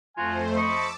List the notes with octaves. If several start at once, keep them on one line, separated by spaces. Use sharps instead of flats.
F2 F3 A3 F4 F#4 C5 G#5
C5 D#5 A5 B5 C#6 D6 E6